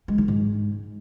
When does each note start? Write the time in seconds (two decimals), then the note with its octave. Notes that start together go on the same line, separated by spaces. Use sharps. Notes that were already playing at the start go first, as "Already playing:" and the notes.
0.08 G#3
0.18 D#3
0.28 G#2